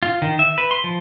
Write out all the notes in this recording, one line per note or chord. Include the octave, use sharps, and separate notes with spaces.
F4
D#3
E5
B4
C6
F3